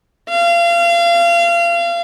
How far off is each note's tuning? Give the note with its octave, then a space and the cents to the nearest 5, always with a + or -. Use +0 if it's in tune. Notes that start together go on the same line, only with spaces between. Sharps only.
F5 -30